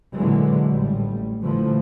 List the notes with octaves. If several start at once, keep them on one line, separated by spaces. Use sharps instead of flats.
A#2 D3 E3 F#3 G#3
A1 A2 G3
A#2 D3 E3 F3 G3 A3